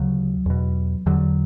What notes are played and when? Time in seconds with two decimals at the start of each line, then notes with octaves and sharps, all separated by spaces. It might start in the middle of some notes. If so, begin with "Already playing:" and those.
Already playing: D2 C#3 F#3
0.46 E2 B2
1.06 E2 D3 F#3